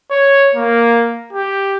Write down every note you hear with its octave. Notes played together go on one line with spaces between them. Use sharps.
C#5
A#3
G4